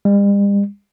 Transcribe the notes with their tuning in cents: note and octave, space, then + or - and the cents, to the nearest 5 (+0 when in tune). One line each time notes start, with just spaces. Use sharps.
G3 +45